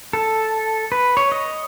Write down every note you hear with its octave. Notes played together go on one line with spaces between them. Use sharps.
A4
B4
C#5
D#5